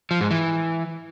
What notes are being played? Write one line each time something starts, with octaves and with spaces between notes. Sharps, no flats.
F3
G#2
E3